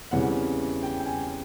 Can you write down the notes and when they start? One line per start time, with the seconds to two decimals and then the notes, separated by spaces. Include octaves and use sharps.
0.11 E2 C#3 E3 G3 C4 F#5
0.83 G5
0.99 G5
1.06 G#5